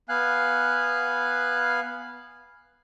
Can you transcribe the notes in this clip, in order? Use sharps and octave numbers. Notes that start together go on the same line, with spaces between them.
B3 F5 G#5 F#6